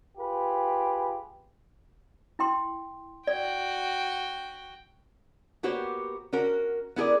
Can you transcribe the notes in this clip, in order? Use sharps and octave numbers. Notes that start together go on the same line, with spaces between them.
F4 G4 G#4 B4
E4 G5 C6
F#4 D5 G5
A#3 B3 F#4 G4 C5 C#5
C#4 F#4 A#4
B3 E4 G#4 A#4 D5